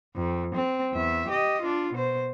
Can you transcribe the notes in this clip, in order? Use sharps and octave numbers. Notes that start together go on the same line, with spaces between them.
F2
C4
E2 E5
G4 D#5
D4 F4
B2 C5